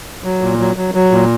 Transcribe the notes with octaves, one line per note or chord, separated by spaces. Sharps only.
F#3
A#2
F#3
F#3
F#3
A#2